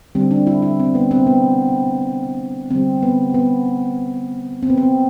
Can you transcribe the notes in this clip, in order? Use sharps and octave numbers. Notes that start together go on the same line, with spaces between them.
D3 G3 C4
D4
E4
E4
C4
B3
C4
B3
D3 G3 C4
B3
B3
C4
B3
C4